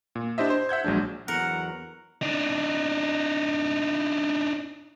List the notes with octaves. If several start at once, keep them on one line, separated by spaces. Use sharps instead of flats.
A#2
D4 E4 G4 C5 D#5 E5
C5
E5 F#5 G6 G#6
A#1 F#3 G#3 D4
E2 F#3 A#4 F#5
D4 D#4